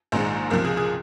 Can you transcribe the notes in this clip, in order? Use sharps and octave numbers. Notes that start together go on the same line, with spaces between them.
A#1 G#2 D#3 G#3 C5
C#2 C3 F3 A#4
G#4
G#4